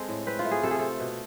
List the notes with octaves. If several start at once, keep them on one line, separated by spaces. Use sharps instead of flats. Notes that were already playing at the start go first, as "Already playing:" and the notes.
Already playing: G#3 C4 A4
A2
C4 B4
F4
A3
G#4
C3 A4
G#4
C4 A4
B2